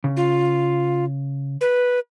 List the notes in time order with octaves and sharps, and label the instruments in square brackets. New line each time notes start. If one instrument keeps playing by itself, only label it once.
[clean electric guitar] C#3
[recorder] F4
B4